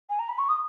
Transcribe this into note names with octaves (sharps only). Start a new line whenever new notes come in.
G#5
A#5
B5
C#6
D#6